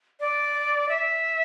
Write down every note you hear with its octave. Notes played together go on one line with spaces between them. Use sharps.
D5
E5